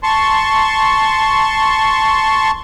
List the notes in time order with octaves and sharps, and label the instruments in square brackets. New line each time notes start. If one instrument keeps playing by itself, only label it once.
[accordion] A5 C6 C#6